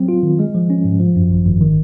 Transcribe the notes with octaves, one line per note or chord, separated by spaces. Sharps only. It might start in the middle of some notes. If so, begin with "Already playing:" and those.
Already playing: F#3 C4
F4
D#3
G#3
F3
C#4
G#2
F3
F#2
G#1
G#1
D#3